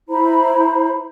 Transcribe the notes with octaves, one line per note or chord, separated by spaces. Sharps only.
E4 C5 A#5 B5